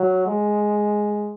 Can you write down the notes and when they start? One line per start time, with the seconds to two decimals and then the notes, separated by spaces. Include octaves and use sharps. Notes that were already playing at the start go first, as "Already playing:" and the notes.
Already playing: F#3
0.27 G#3